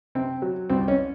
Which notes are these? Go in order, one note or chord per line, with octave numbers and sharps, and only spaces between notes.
C3 C4
F#3
C2 C4
C#4